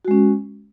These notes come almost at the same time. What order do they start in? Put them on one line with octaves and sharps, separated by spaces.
F#4 G#3 C#4